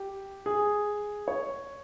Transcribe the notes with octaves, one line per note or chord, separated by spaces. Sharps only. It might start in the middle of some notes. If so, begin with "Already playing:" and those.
Already playing: G4
G#4
C#5